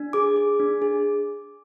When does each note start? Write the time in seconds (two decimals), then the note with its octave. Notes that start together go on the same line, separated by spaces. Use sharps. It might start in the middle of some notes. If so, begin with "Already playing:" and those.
Already playing: D4
0.13 G#4 D6
0.36 G#4
0.60 D4
0.82 G#4